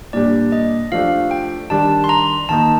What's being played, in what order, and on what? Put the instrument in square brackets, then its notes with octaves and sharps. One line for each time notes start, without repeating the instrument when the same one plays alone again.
[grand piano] A#2 G3 D4 G4 [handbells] D5
[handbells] D#5
[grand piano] F3 A3 D4 G4 [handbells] F5
[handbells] G5
[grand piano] D#3 G3 D4 G4 [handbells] A5
[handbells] C6
A#5
[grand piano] D#3 A#3 D#4 [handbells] A5